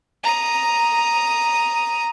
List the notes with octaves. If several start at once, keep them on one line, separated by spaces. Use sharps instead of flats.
A#5 D#6